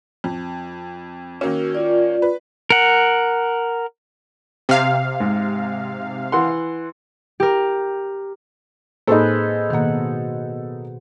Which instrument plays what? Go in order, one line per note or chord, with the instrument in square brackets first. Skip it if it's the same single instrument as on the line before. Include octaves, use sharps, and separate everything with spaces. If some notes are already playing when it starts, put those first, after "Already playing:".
[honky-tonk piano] F2
[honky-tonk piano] D#3 A#3 C#4 [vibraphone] F#4 E6
[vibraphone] F4 D5
[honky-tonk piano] B4
[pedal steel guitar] A#4 F#5
[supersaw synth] C3 F5
[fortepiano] G#2
E3 F#5 C6
[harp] G4 A#4
[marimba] A2 A#3 [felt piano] D#4 A4 [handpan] G#4 B4 C5
[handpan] B2 F#5 [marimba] D#3 A#3